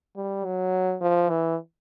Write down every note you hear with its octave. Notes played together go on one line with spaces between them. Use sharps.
G3
F#3
F3
E3